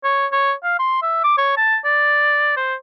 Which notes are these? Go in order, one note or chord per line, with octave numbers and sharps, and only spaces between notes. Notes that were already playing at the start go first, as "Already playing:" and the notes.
C#5
C#5
F5
C6
E5
D6
C#5
A5
D5
C5